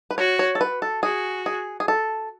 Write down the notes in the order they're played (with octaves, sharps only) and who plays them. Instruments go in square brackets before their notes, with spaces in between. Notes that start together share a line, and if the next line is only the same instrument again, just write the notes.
[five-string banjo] B4
[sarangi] F#4 [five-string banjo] C#5
[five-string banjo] C#5
A4
B4
A4
[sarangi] F#4 [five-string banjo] G#4
[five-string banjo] G#4
G#4
A4